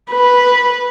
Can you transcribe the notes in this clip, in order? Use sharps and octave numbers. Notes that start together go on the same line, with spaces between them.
B4